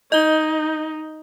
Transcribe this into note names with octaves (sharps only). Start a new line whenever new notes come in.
D#4 D#5 G6 G7